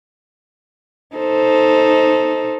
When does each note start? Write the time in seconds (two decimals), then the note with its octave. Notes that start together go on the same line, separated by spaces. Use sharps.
1.16 D#4 A4 C5